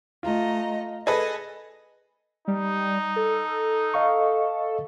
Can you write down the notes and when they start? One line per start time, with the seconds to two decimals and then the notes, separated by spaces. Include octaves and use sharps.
0.23 A3 F4 D#5 A#5
1.07 G#4 A4 B4 D#5 A#6
2.48 G3 D#4
3.16 A4
3.94 D#5 F5 C#6